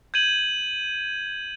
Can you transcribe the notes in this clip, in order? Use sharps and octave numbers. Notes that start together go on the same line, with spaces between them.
G6 G#6 D#7 F#7